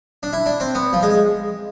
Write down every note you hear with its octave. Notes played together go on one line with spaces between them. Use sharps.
D4
E4
D4
C4
B3
F3
G#3